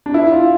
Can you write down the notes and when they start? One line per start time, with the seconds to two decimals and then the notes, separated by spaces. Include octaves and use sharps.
0.06 D4
0.14 E4
0.32 F4